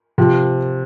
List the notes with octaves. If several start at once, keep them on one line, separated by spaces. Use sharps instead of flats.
C3 F3